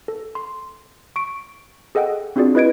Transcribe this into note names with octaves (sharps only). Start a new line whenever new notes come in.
A4
C6
C#6 D7
G#4 A4 D#5 F#5 G5
C4 D4 F4 F#4 G#4 D5
E4 B4 D#5 G#6 D7